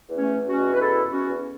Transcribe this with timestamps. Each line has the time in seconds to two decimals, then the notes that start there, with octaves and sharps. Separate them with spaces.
0.09 E2
0.18 A3 C#4
0.33 E2
0.49 C#4 F#4
0.57 B2
0.73 B4
0.80 E2 E4 A4
1.04 E2
1.12 C#4 F#4
1.28 E2